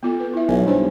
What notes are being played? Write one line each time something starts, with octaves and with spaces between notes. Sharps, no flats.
B3 F4 A4
B4
E4 E5
B1 G#5
G2 D#4 C5 C#5